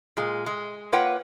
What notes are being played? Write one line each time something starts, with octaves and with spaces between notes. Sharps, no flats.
A#2 G#3
G#3
A#3 F4 B4 C#5 F#5 G5